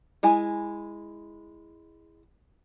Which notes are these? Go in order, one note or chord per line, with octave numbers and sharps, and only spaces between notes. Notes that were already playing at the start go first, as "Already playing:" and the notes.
G#3 E4 G#5